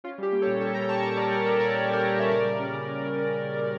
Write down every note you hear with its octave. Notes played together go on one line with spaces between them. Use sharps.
C#4 F4
G3 G4
A#3
A4 C#5
A#2
C#4 A4 C#5
G3 G5 A#5
A#3 A5 C#6
A#2 G5 A#5
C#4 A#4 D5
G3 G4 A#4
A#3 A4 C#5
A#2 A#4 D5
C#4
G3
G4 A#4
A#3
A#2 E5
C#3 A#4 D5
G3
C#4
C#3
C#3
G3
C#4
C#3
C#3
G3